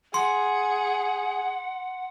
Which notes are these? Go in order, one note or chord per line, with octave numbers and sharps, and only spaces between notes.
G#4 F#5 C6